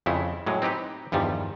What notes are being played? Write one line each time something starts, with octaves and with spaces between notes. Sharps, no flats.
F2 C#3 E4
A2 F#3 G#3
C4 D#4 G4 B4
E2 G2 D#3 F3 G3